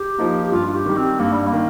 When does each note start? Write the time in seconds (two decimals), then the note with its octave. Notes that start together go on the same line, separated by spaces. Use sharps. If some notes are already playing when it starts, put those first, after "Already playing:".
Already playing: G4
0.18 F3 A#3 D#4
0.44 G4
0.52 G2 F4
0.66 F4
0.75 G4
0.85 D#3 G3
0.97 C4
1.19 G2 A#3
1.33 G3
1.47 A#3
1.53 D#3